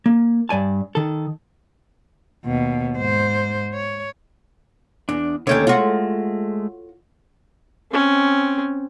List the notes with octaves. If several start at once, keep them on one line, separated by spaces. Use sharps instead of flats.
A#3
G2 D5 G#5 A5
D#3 A4
D#2 B2
G#2 C5
C#5
E2 D4
D#2 D3 A3 C#4 C#5 G5
G#3 A3 F4 F#4
C4 C#4